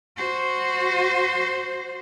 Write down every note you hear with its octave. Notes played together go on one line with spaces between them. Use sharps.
F#4 C5